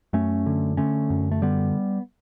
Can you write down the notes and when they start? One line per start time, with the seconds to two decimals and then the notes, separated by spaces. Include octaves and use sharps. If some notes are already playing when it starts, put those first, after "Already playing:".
0.13 F#2 A3 C#4
0.46 D3
0.77 D3 A3 C#4
1.10 F#2
1.31 A3
1.42 D3 G3 B3